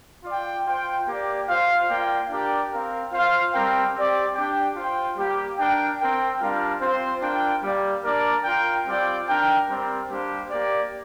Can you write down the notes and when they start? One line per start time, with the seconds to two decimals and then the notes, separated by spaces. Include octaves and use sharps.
0.24 F4 D5 G5
0.65 F4 C5 G5
1.07 A#3 G4 D5
1.48 F4 C5 F5
1.88 A#3 F4 D5 G5
2.29 D4 G4 A#4 D5 G5
2.71 C4 A#4 F5
3.12 F4 C5 F5
3.52 G3 C4 G4 A#4 G5
3.94 C4 G4 D5
4.35 D4 G4 D5 G5
4.75 F4 C5 G5
5.17 G3 A#3 G4
5.58 D4 A#4 G5
5.99 C4 A#4 G5
6.40 G3 D4 F4 A#4 F5
6.80 C4 F4 C5
7.21 D4 F4 A#4 G5
7.63 G3 A#3 G4 D5
8.03 A#3 D4 A#4 D5
8.44 F4 A#4 G5
8.86 G3 C4 F4 D5 G5
9.27 D4 A#4 G5
9.68 G3 C4 A#4 D5
10.09 G3 A#3 D4 G4 C5
10.50 A#3 G4 D5